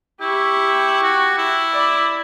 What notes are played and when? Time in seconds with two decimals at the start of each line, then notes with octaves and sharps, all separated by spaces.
0.21 E4 G4 C#6
1.03 F#4
1.38 E4
1.71 D5 B5